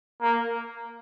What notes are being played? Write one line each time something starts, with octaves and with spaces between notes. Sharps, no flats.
A#3